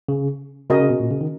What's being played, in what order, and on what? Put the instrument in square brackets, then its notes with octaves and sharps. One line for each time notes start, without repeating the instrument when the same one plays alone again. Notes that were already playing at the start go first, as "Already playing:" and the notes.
[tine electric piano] C#3
[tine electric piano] C#3 [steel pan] C#4 F#4 A#4 D#5
[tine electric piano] C#3
B2
A#2
C#3
D#3